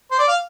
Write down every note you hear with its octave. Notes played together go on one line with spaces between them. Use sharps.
C5
D5
F5